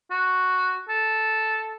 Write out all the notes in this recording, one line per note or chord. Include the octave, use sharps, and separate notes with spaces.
F#4
A4